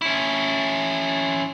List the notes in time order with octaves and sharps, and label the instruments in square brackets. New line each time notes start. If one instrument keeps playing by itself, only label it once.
[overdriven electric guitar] C#4 E4